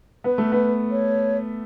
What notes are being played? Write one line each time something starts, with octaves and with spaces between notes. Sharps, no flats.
B3 B4
A3
B3
C#5